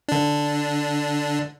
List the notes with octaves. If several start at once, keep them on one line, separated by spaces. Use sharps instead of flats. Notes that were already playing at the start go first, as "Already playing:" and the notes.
D3 D4